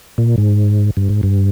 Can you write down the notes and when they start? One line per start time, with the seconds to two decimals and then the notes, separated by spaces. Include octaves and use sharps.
0.18 A#2
0.38 G#2
0.97 G2
1.09 G#2
1.23 G2